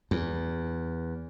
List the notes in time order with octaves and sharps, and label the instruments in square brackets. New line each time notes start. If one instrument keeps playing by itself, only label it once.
[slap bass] E2